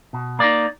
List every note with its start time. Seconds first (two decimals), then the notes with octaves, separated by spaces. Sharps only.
0.13 B2
0.39 A#3 D#4 D5